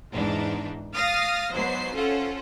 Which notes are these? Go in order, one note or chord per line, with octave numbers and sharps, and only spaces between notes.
E2 G#2 E3 D4 D#4
F5 D#6 F6 A6 A#6 C7
G#2 F#3 B3 C5 C7
C#4 F4 A4 C5 F#5